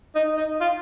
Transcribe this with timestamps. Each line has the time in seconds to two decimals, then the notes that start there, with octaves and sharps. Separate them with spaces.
0.15 D#4
0.37 D#4
0.60 F4